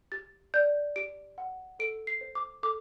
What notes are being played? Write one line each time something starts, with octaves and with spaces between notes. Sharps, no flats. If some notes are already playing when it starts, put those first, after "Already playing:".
G4 A6
D5 G6
G4 D7
F#5
A4 D7
C7
C5
D6
A4 D6